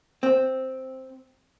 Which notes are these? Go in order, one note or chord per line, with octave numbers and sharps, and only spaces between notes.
C4